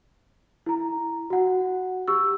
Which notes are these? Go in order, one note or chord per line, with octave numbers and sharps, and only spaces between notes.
E4 A#5
F#4 F#5
G4 C#6 E6